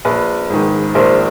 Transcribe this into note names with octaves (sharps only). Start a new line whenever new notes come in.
A#1 B4
G#2 D#3
A#1 A#4 C5